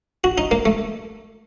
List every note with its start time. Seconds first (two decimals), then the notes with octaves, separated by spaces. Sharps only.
0.24 F#4
0.38 D#4
0.51 A#3
0.65 A3